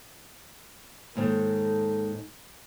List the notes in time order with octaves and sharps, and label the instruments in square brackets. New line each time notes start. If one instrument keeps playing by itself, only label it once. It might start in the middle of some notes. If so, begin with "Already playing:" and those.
[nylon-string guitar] D#2 G#2 D#3 [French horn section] A4